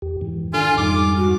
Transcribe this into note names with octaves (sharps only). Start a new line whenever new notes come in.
E2 G4
G#2 E3
D#3 D4 F4 A4 G#5
F2 G#2 G3 D#4 D6
F#4